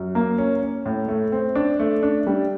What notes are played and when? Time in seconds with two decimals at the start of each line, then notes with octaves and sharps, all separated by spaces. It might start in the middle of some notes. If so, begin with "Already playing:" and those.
Already playing: F#2
0.15 A#3
0.38 C#4
0.62 C#4
0.86 A2
1.08 A3
1.32 C4
1.55 D4
1.80 A3
2.03 D4
2.27 G3